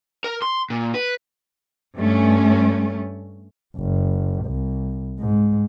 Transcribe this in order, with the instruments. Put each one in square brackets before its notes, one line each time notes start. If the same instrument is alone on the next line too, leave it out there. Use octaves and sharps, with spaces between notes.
[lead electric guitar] A#4
C6
A#2
B4
[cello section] G2 A3 C#4
[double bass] F#1
C2
G#2